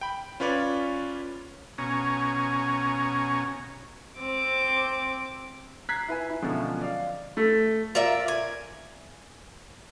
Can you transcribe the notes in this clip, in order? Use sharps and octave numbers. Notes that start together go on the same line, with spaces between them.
G5 B5
C#4 F4 B4 C#5 D5
B2 C#4 G#5 A#5 C#6
C4 D6
A#5 F#6 G#6 B6 C7
E4 B4 G#5
E4
B2 D3 F3 F#3 G#3 C#4
D5 F5
A3
F4 A#4 D5 E5
G#5